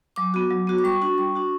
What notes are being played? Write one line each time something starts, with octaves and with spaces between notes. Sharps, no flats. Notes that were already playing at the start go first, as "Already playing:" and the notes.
F#3 D6
B3 F#4
F#3
B3 F#4
D6
G3 C#6
D4 F#4
G3 C#6
D4 F#4